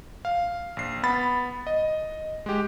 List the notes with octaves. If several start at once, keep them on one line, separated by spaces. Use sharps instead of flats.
F5
A#1 C7
B3 B5 A6
D#5
G#3 G4